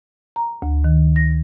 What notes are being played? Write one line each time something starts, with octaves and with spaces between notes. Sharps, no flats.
A#5
D2
D#3
A#6